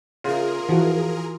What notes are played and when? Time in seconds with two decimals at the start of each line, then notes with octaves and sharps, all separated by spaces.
0.24 C#3 F4 G#4 A#4
0.69 E3 F3 F#4